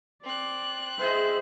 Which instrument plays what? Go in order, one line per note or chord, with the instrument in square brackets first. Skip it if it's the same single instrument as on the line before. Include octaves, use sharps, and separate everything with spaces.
[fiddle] C4 F#6 [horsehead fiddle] D5
[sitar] E4 G#4 D#5 [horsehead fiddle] C5 E5